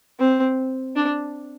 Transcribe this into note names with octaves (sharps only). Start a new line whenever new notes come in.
C4
D4